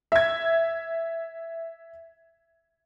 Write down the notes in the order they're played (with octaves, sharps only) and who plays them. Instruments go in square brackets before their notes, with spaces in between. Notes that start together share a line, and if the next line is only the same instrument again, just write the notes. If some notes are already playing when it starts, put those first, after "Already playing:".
[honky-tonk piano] E5 G#6